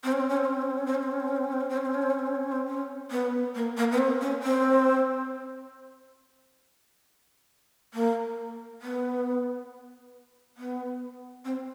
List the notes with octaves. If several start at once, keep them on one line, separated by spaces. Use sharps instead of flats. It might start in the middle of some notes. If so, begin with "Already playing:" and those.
C4
C#4
C4
C#4
C4
C#4
C4
C#4
C4
C#4
C4
C#4
C4
C#4
C4
C#4
C4
C#4
C4
C#4
C4
C#4
C4
C#4
C4
C#4
C4
C#4
C4
C#4
C4
C#4
B3
A#3
A#3
B3
C4
C#4
C4
A#3
B3
B3
C4